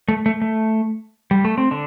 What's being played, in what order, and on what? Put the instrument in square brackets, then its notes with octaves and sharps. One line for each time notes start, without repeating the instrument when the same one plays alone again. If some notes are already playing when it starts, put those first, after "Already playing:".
[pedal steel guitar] A3
A3
A3
G3
A3
C4
D3 D4